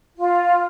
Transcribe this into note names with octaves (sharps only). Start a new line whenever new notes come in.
F4